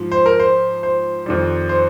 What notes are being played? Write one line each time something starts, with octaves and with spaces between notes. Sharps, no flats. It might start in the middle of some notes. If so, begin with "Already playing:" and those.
Already playing: G#2 F3
C5
A#4
C5
C5
F2 D#3 G3
C5